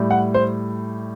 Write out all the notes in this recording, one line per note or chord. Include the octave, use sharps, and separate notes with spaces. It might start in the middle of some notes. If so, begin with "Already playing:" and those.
Already playing: A2 G3
F#5
C5